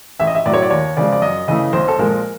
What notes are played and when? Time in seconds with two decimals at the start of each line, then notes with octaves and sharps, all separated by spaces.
0.19 A1 E5
0.27 D#5
0.35 E5
0.46 A2 F#3 D5
0.54 C#5
0.63 D5
0.70 D#2 C#5
0.97 C#3 F3 G#3 D5
1.12 D5
1.22 F#2 D#5
1.48 C#3 E3 A3 D#5
1.73 B1 C5
1.88 A4
1.98 A#2 F3 G#3 A#4